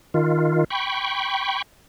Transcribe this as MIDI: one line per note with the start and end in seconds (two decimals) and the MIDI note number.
0.14 0.64 51
0.14 0.64 65
0.70 1.62 79
0.70 1.62 83
0.70 1.62 85